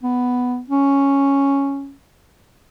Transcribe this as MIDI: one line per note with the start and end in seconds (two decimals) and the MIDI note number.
0.03 0.61 59
0.70 1.93 61